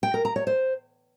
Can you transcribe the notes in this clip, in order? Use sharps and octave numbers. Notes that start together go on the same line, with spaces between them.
G5
A#4
A#5
C#5
C5